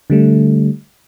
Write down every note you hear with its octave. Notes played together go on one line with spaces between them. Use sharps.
D3 G3 A3